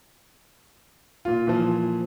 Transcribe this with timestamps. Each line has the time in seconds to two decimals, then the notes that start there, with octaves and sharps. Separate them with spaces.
1.25 A#2 F4
1.47 A#2 E3 F3